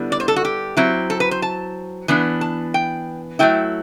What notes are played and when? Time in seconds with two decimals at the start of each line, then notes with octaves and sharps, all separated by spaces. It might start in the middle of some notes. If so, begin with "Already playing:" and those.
Already playing: D3 G3 B3 E4
0.12 D5
0.20 C5
0.28 A4
0.36 F#4
0.45 G4
0.77 F#3 C4 E4
1.10 A4
1.20 B4
1.31 C5
1.42 A5
2.08 E3 B3 D4
2.41 A5
2.74 G5
3.39 F#3 A3 E4 G5